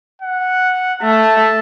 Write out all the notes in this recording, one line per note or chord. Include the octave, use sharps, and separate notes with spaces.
F#5
A3 A5